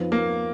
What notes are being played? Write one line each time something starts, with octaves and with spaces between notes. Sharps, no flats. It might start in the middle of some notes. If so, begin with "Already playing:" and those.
Already playing: F2 F3 B3 D#4
A#3